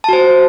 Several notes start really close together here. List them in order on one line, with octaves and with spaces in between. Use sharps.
A5 F#4 C5